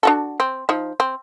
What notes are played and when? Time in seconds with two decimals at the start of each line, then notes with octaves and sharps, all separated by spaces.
0.03 D4 F#4 A4
0.40 C4
0.69 F3 D#4
1.00 C4